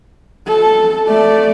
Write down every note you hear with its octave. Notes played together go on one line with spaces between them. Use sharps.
A4
A3 D5